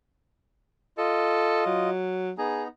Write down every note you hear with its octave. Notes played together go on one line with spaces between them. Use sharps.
F4 A4 D#5
F#3
B3 D#4 G#4 A#5